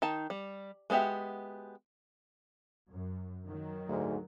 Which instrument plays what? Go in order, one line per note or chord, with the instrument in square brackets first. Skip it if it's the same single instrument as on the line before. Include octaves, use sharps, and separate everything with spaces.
[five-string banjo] D#3 D#4 A5
G3
G#3 B3 F#4 G4 E5
[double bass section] F#2
D#3 F#3
[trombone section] D2 G#2